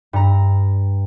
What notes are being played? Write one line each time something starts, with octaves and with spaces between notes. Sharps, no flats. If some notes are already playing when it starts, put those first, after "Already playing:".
G2 A#5